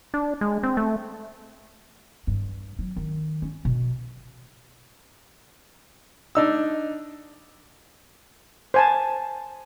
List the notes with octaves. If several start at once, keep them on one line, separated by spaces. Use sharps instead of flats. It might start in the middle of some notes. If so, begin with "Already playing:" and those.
D4
G#3
C4
A3
G2
F#3
D#3
C#4
B2
D4 D#4 E6
C5 G#5 A5